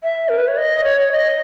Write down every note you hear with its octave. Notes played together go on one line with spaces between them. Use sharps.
E5
A#4
B4
C#5
D#5
C#5
D#5